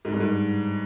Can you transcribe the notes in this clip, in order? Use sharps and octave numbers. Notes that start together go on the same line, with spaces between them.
G#2
G2
G#2